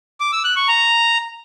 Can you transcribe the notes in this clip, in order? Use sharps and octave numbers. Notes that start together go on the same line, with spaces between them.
D6
E6
F#6
C#6
A#5